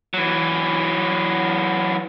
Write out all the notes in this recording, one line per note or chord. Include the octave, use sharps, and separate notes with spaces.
E3 F#3